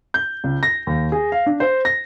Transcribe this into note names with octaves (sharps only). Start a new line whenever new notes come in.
G6
C#2
A#6
D#2
G#4
F5
D4
C5
A#6